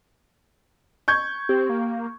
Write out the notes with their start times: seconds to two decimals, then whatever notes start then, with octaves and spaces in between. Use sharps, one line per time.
1.08 C#6 G6 G#6
1.49 C4 G4
1.69 A#3